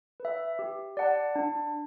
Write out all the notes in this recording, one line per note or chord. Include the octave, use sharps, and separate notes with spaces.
B4
E5
G4
D5 F#5 A5
D4